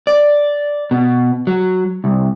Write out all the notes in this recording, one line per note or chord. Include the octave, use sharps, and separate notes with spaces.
D5
B2
F#3
C2